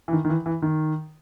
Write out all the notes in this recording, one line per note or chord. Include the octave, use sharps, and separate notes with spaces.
E3
D#3
D#3
E3
E3
D#3